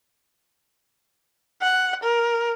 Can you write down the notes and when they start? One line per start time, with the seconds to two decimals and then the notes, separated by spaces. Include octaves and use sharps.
1.62 F#5
2.03 A#4